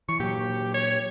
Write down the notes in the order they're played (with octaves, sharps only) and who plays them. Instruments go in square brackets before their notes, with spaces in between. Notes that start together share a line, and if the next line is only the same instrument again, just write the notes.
[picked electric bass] E3 [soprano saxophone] C#6
[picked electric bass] A#2 F#3 [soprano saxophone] G4
[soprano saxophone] C#5